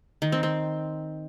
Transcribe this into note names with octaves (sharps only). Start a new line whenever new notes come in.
D#3
C4
C4